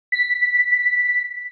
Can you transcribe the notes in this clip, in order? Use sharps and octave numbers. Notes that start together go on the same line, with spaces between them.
B6